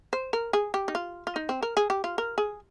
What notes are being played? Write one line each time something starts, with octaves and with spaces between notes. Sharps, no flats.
C5
A#4
G#4
G4
D#4
F4
F4
D#4
C4
A#4
G#4
G4
F4
A#4
G#4